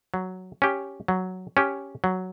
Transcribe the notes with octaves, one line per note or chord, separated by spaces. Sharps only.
F#3
C#4 G4
F#3
C#4 G4
F#3